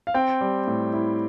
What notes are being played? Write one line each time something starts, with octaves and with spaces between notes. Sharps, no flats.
F5
C4 G5
G3
A2
E4